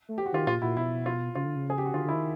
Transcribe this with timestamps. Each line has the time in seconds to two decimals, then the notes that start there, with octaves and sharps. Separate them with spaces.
0.09 A3
0.18 G4
0.26 F#4
0.32 D#3 F4 G4
0.47 A#2 F4 G4
0.62 A#2 E4 F#4
0.76 B2 E4
1.06 F4
1.35 C#3 F4
1.45 D3
1.56 C#3
1.70 G#4
1.78 G4
1.86 F#4
1.94 D3 F4
2.04 D3
2.09 E4
2.13 D#3